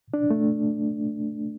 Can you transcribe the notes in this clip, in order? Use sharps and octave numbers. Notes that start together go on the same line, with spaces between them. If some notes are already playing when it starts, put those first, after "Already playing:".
D4
A3